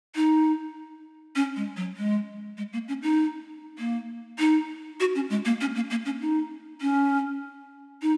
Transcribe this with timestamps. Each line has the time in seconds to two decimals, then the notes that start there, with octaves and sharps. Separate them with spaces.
0.15 D#4
1.36 C#4
1.56 G#3
1.76 F#3
1.97 G#3
2.57 G#3
2.73 A#3
2.88 C#4
3.02 D#4
3.79 A#3
4.39 D#4
5.00 F#4
5.15 C#4
5.30 G#3
5.45 A#3
5.61 C#4
5.75 A#3
5.90 A#3
6.05 C#4
6.21 D#4
6.81 C#4
8.02 D#4